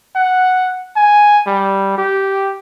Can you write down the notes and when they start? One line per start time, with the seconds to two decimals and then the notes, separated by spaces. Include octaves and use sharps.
0.15 F#5
0.96 G#5
1.47 G3
1.98 G4